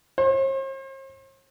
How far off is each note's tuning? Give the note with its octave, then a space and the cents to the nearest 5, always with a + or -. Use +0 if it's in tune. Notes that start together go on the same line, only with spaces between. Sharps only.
C5 +45